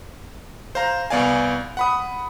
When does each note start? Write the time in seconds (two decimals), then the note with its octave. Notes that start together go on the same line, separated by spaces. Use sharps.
0.75 C5 F5 A#5
1.10 C2 B3 D5 F5 G#5
1.77 F#5 B5 D#6